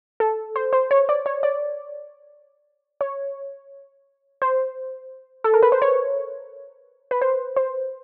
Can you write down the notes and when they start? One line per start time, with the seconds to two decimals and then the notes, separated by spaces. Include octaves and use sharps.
0.20 A4
0.56 C5
0.73 C5
0.91 C#5
1.09 D5
1.26 C#5
1.43 D5
3.01 C#5
4.42 C5
5.44 A4
5.54 A#4
5.62 B4
5.72 C5
5.82 C#5
7.11 B4
7.21 C5
7.57 C5